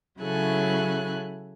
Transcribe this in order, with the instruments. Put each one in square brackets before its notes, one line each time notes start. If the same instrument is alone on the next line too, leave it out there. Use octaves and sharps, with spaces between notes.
[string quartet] C#3 F#3 E4 A4 G#5 F#6